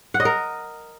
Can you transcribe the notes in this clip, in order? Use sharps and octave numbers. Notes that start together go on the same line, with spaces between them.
F#5
D#5
A#4